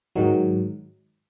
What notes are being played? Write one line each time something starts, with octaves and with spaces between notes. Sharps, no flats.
G#2 D#3 F#3